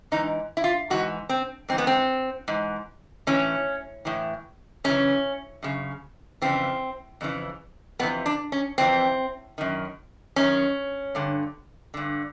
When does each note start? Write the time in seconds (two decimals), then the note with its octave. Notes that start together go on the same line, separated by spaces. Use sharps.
0.12 G#2 E3 D#4
0.57 E4
0.64 F4
0.90 G#2 E3 F#4
1.29 C4
1.69 G#2 E3 C4
1.78 B3
1.87 C4
2.48 G#2 E3
3.27 A2 E3 C#4
4.05 A2 E3
4.84 F#2 C#3 E3 C#4
5.63 F#2 C#3
6.42 F2 C#3 E3 C4
7.21 F2 C#3 E3
7.99 F2 C3 E3 B3
8.26 D4
8.52 C#4
8.78 F2 C3 E3 C4
9.58 F#2 D#3
10.36 F#2 D#3 C#4
11.15 G2 D3
11.94 G2 D3